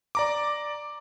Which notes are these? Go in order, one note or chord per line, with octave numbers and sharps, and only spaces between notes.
D5 A#5 D6